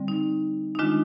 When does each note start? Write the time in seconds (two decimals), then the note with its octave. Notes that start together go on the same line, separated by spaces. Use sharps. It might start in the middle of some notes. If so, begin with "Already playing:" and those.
Already playing: D3 G3 C4
0.08 D#4
0.75 D#4
0.79 D#3 G#3 D4 F4